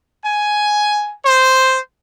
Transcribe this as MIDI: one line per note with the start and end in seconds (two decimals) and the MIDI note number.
0.24 1.13 80
1.24 1.79 72